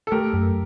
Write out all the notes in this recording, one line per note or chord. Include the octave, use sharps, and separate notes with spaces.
A4
A3 G4 A#4
F#2